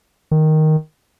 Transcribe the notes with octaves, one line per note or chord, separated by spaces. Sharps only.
D#3